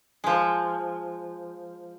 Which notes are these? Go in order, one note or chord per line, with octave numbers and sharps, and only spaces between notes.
F3 G#3